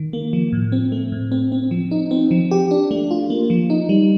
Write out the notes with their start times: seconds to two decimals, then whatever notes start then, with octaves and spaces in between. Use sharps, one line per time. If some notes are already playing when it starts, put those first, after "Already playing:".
Already playing: D#3
0.13 A#3
0.33 F3
0.53 A2
0.72 C4
0.92 A3
1.12 A2
1.32 C4
1.52 C4
1.71 F3
1.91 D#4
2.11 C4
2.31 F3
2.51 G4
2.71 D4
2.91 A3
3.11 F4
3.30 A#3
3.50 F3
3.70 D#4
3.89 G3